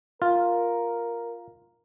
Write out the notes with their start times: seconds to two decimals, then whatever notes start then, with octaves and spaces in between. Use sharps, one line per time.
0.22 F4 A#4